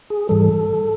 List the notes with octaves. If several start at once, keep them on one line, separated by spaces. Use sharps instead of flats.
G#4
G#2 E3 G3 A4